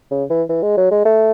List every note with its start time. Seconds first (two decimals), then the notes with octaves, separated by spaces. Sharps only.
0.11 C#3
0.30 E3
0.49 E3
0.63 G#3
0.77 F#3
0.91 G#3
1.06 A3